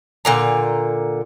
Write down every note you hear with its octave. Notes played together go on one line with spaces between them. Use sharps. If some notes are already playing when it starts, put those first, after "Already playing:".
A#2 D3 A#5